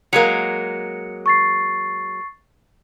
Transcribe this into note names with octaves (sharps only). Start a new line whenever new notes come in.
F#3 G#3 A#3 C#7
C#6 A6 C7